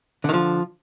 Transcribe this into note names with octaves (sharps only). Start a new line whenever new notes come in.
D3 D#3 F3